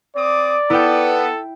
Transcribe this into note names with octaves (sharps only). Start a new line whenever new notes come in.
C4 D5 D6 D#6
B3 E4 A4 G5